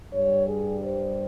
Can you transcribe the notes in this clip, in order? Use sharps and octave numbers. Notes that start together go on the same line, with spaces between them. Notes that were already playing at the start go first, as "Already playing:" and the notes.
G2 G3 C#5
G#4
C5